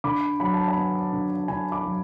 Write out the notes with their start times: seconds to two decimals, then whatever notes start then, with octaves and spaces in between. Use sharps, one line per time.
0.04 D3 B5 D6
0.40 F#3 B5
0.54 A5
0.68 G#5 B5
0.77 B3
1.12 D3
1.48 D3 G#5 B5
1.72 B5 D6
1.84 F#3